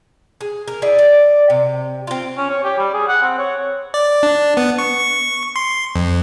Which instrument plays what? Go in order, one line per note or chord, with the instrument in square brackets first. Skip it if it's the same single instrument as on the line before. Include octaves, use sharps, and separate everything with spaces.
[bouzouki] G#4
A#4
E4 G#4 D5
D5
C3
C4 F4
[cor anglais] C#4
C#5
G4
G3
G#4
F#5
C4
C#5
[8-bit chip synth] D5
D4
B3
C#6
C#6
C6
F2